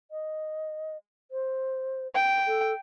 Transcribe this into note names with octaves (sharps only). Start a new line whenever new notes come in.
D#5
C5
G5
A4